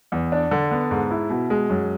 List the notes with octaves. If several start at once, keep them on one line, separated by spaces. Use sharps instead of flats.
E2
D4
D3
B3
G#2
E4
B2
G#3
F#2